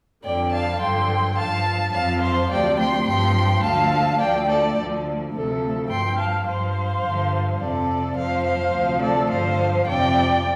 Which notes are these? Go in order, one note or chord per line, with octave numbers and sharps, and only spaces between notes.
F2 D3 F3 D5 G5
F5 A5
G2 D3 F3 G5 C6
G2 F3 F5 A5
F2 F3 F5 A5
C5 F5
D2 C3 F3 D5 G5
G5 C6
G2 F3 G5 C6
D2 D3 F3 F5 A5
D2 D3 F3 D5 G5
A4 D5
D2 D3 F3
D2 C3 F3 A4
G2 F3 G5 C6
F5 A5
G2 F3 C5 F5
G2 D3 F3
F2 C3 F3 A4 D5
F2 F3 C5 F5
C5 F5
D2 C3 F3
A4 D5
G2 D3 F3 C5 F5
F2 C3 F3 D5 G5